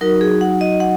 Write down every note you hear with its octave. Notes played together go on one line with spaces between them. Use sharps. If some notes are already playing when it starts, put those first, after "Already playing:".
F#3 D#4 F#4 A#4
G#4
F#5
D#5
F#5